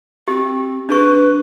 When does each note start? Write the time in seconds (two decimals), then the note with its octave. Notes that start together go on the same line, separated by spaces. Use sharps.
0.28 C4 G4
0.89 D4 G#4 B4 C#6